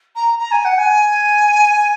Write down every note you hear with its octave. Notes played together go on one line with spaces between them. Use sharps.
A#5
A#5
G#5
F#5
G#5